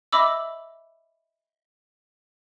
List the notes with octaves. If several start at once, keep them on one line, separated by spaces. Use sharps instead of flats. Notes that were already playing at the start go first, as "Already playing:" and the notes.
D#5 E5 B5 D6 E6